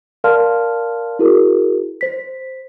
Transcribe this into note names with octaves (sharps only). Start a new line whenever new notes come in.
A#4 D5 F5 A5 C6 F6
E4 F#4 G#4 A#4
C5 B6